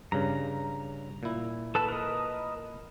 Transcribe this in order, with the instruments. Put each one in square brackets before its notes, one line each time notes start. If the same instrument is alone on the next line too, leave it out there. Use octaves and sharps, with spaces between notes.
[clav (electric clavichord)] G2 C#3 [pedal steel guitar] A#5
[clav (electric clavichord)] A#2 E4
[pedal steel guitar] A4 B4 A5
A#4 B4 D#5